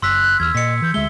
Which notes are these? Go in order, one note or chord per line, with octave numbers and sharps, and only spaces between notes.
F#1 C6 E6 F#6 B6
E2 E6 F6 G#6
A#2 D#5 B6 C#7
E3 G6
D2 G#3 E5 G7